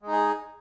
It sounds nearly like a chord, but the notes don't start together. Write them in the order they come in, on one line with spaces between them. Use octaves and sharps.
G#3 D#4 G#4